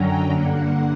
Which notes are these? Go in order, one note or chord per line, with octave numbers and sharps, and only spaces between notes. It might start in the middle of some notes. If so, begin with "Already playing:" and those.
Already playing: F#2 D3 F#3 C#4 G5 A#5
G2 D3 A#3 F#5